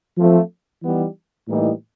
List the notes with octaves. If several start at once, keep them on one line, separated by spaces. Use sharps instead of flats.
F3 A3 C4
E3 G3 B3 D#4
A2 E3 G3 A#3 D#4